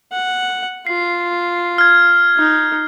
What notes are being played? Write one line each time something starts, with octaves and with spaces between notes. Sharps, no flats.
F#5
F4 C7
F6 G#6
D#4